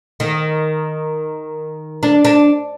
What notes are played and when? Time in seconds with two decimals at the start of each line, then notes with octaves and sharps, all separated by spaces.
0.20 D#3
2.03 D4
2.25 D4